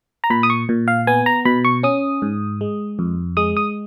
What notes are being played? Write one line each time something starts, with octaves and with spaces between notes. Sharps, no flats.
A#5
A#2 B5
D#6
C#6
A#2
F5
B3 G#5
A#5
B2 B5
C#6
C#4 D#6
G#2
G#3
F2
G#3 D#6
D#6